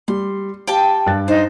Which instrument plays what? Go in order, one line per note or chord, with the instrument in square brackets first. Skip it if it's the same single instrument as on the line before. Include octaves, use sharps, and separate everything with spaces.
[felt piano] G3 [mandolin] C6
[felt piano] G4 F5 [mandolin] G5 A5
[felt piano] G2 F#6 A6
[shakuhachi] D#4 [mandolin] C5